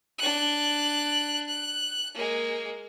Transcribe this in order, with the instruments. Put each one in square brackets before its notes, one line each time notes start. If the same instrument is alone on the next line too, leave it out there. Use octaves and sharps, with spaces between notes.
[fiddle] D4 F#6
F#6
G#3 A#3